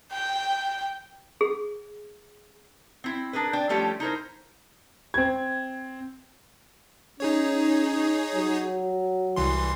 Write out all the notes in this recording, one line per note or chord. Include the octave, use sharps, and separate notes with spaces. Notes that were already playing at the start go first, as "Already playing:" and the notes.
G5
G#4
C4 E4
D4 G#4 A#4 B4
D4 G5
F3 G3 A3 C#4 G4
D#4 E4 A#4 C5
C4 G#6
C#4 D#4 G#4 C#5
F#3
C2 E3 C6